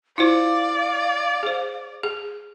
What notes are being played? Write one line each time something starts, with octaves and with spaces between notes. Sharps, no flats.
E4 F4 C5 D5 F5
G#4 C5
G#4